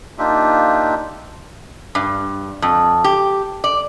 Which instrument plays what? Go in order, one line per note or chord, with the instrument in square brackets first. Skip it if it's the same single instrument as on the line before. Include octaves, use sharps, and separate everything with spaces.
[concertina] A#3 D4 D#4 F4 G4 E5
[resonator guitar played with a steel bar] G2
F2
G4
D5